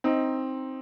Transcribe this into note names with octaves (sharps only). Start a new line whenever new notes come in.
C4 D#4